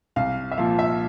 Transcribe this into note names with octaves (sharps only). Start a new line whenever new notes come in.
C2 F5
E5
A#2 F3 F5
E5